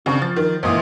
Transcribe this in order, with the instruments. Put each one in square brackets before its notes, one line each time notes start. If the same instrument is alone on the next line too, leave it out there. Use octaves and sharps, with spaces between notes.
[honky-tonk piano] C#3 [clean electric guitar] C4 D4 F#4
[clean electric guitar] F3 [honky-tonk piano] A6
[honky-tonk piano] D#3
[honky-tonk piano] C#2 A#2 E3 [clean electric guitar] C5 D#5